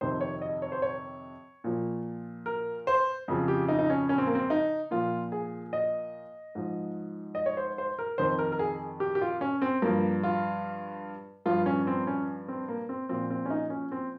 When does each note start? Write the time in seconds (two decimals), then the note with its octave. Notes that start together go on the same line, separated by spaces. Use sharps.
0.01 F2 C3 D#3 C5
0.21 C#5
0.42 D#5
0.62 C#5
0.72 C5
0.82 C#5
1.64 A#2 F3
2.46 A#4
2.87 C5
3.28 F2 C#3 F3
3.48 G4
3.68 D#4
3.79 D#4
3.90 C#4
4.09 C#4
4.18 C4
4.27 A#3
4.35 C4
4.50 D#4
4.91 A#2 F3 F4
5.32 G#4
5.73 D#5
6.55 G#2 F3
7.35 D#5
7.46 C#5
7.57 C5
7.78 C5
7.99 A#4
8.18 F2 D#3 C5
8.39 A#4
8.52 A#4
8.59 G#4
9.00 G4
9.15 G4
9.21 F4
9.41 C#4
9.62 C4
9.82 G2 F3 A#3
10.23 F4
11.46 G2 F3 F4
11.66 C#4
11.87 C4
12.07 C#4
12.48 C4
12.68 A#3
12.89 C4
13.09 A#2 F3 C4
13.30 C4
13.46 C#4
13.50 D#4
13.70 C#4
13.92 C4